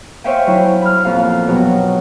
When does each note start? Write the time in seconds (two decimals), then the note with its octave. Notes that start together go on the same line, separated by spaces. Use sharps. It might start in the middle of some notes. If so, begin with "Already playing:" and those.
0.24 C5 C#5 E5 F5 G5 G#5
0.47 F#3 E4
0.82 B5 F6
1.05 F2 A#2 F5
1.47 G2 B2 F#3